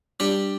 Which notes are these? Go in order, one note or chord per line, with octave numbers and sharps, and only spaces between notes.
G3 D4 G4